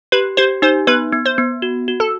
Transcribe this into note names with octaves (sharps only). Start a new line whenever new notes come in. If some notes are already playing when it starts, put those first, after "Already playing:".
G4 B4
G4 C5
D#4 C5
B3 B4
B3
C5
B3
F#4
F#4
A4